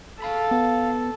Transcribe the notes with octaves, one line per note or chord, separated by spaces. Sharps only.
A4 F5 B5
B3